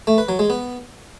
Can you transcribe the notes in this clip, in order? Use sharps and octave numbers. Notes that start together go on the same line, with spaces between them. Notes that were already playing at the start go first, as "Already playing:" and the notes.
A3
B4
F#3
G#3
B3